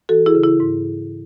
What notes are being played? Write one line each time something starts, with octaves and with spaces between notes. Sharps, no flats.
E3 F#4 A4
E4 G#4
C#3
E4
G#2